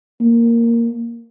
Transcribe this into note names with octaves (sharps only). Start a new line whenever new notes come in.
A#3